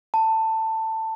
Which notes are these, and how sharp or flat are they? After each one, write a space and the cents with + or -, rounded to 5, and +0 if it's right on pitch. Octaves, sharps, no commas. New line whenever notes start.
A5 +15